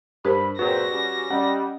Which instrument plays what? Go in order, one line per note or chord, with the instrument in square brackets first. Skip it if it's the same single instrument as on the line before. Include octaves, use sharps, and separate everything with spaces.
[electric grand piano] G2 [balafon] G4 A#4 C5 [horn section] B5
[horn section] A#2 F#3 C4 [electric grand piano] F#4 G#4 [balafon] B4 [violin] A#6
[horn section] G3 C#4
[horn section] G3 [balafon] C#4 [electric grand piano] D#5 F#5